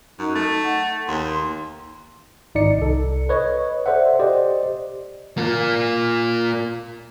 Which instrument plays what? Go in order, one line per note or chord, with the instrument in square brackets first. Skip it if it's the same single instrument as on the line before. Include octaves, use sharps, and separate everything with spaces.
[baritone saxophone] F#2 [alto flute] D#4
[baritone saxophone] A3
[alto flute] F#5
[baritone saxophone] D#2 [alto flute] C6
[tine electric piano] G#1 D#4 D5 C#7
C2 A4
B4 C#5 D#5
A4 C5 D5 E5 F#5
G4 C5 D5 D#5
[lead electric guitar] A#3 F4